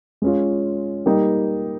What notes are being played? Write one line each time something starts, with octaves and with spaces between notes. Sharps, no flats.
G#3 C#4 F4
G3 A#3 D#4 G4